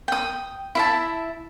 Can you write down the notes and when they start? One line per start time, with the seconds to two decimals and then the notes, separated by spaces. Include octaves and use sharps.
0.08 G5 D#6
0.75 E4 E5 A5